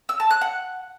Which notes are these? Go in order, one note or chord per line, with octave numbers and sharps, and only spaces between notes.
E6
A5
F#6
F#5